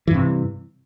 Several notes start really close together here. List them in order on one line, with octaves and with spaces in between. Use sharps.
E3 G2 C3